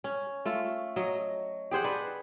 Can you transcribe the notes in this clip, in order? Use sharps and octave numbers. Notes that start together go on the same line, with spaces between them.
C#4
A3 F4
F#3 D#5
G4 G#4 C5 F#5
D4 B4